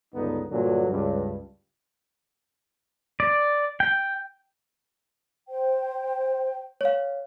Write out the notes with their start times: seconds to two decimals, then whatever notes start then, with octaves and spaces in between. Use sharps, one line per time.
0.13 C#2 G2 D3 B3 D#4
0.51 G2 A#2 D3 F#3
0.90 C#2 G2
3.20 D5
3.80 G5
5.48 C5 G5
6.81 C#5 F5